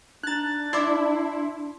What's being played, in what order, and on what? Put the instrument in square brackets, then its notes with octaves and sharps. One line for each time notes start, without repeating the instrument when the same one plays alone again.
[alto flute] D4 [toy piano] D#4 A#5 [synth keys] F#6 A6
[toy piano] D#4 D5 D6 [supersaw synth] E4 [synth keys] C6